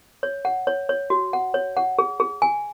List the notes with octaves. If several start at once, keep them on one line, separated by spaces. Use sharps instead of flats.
C#5
F#5
C#5
C#5
F#4
F#5
C#5
F#5
G#4
G#4
G#5